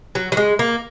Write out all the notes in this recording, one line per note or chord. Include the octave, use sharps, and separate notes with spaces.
F#3
F#3
G#3
A#3